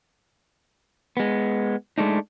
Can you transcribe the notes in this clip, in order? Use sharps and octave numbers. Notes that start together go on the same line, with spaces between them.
G#3 B3
G#3 A3 D4 D#4